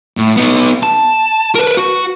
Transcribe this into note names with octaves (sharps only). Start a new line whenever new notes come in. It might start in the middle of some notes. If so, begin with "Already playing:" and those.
A2
B3 D#4
A5
A#4 B4
F#4